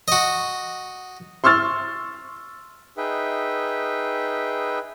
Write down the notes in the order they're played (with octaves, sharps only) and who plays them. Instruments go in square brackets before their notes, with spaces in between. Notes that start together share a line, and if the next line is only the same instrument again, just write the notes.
[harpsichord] F#4 D#5
[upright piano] C6 C#6 E6 F6 A6
[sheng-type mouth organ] D#4 G#4 B4 E5 G5